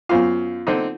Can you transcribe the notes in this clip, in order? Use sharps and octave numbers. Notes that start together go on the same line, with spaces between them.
F#2 B3 F4 C5 F5
D3 C4 D#4